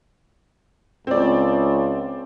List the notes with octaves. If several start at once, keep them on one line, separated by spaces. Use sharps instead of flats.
C#2 C4 D5